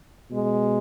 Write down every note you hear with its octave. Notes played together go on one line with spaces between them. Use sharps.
B2 G#3